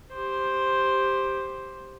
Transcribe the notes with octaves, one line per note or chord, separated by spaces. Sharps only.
G4 C5